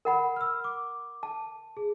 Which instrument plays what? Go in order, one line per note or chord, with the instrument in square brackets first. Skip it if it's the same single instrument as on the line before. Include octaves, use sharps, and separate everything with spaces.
[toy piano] A#4 F#5 B5
[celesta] E6 F6
D6
[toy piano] A5
[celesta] G#4